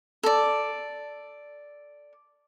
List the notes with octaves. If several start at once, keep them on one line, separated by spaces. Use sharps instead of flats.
A4 D5